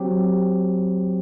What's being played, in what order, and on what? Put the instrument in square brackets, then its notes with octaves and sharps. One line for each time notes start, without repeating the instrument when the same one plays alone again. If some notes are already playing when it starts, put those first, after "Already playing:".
Already playing: [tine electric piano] F#3 C4 G4